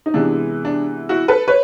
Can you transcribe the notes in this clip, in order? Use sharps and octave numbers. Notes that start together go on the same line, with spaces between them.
D#4
C3 E3 G#3 B3 D4
D4
E4 F#4
A4 B4
B4 C#5